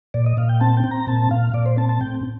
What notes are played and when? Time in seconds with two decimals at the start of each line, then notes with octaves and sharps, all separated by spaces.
0.14 A#2 D5
0.26 D#5
0.37 A#2 F5
0.49 G5
0.61 C4 A5
0.77 G5
0.84 C4
0.91 A#5
1.07 A#2 A5
1.31 A#2 F5
1.54 A#2 D5
1.66 C5
1.77 C4 A5
1.89 A5
2.01 A2 G5